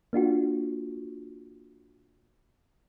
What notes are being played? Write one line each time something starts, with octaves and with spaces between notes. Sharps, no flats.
A#3 D4 F4 F#4